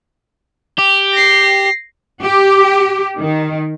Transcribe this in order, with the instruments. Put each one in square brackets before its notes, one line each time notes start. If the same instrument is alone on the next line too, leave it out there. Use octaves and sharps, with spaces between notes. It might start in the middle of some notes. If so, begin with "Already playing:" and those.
[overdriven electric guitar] G4
[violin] A#6 C7
[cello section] G4
D#3